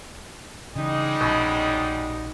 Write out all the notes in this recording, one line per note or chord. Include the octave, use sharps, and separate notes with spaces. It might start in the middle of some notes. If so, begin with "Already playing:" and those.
C#3 E3 G3 G#3 D#4
A#1 F#2 B2 F3 F#3